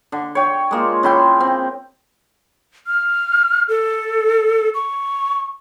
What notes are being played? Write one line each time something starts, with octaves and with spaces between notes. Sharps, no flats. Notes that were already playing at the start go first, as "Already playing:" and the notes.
D3
C#5 G5
G#3 A#3 F4
C#3 E4 G5 C6
C4
F6
A4
C#6